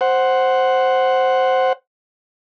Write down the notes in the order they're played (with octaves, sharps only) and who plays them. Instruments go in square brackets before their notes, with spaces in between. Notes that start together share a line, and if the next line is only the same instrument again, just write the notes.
[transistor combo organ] C5 F#5